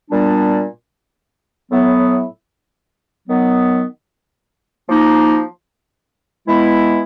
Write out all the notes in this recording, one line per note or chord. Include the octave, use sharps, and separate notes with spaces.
A#2 G3 B3 D4
A2 F#3 B3 E4
D#3 F#3 B3
F3 A#3 D#4
E3 G#3 B3 E4